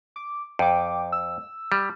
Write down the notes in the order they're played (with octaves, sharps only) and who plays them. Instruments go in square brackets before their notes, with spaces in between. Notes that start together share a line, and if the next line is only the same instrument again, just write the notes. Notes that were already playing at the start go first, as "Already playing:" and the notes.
[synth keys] D6
[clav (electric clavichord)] F2 [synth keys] G5 D6
[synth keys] E6
[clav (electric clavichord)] G3